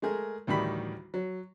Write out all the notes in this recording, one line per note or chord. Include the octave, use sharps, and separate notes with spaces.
G#3 A3 G#4 A#4
A1 D2 D#3 G3 B5
F#3